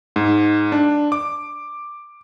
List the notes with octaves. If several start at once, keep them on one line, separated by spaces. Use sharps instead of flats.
G#2
D4
D6